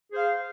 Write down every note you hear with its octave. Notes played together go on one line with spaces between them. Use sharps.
G#4 C5 F5